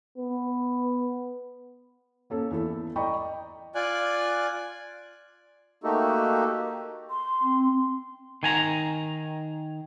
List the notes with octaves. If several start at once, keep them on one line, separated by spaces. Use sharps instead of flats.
B3
A#3 C#4 A4
E2 E4 A4
D5 D#5 G5 A#5 B5 C#6
F4 D5 G#5 F#6
A3 A#3 D#4 F#4 G4 A4
C6
C4
D#3 G#5 A#5